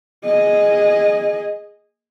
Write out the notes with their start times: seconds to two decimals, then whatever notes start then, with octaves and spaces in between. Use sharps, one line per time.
0.25 G#4 D#5